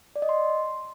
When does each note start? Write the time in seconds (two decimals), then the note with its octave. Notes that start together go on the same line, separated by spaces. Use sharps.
0.16 D5
0.22 D#5
0.29 C6